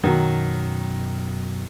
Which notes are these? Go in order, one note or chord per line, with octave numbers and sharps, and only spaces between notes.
F#2 B2 D#3 F#3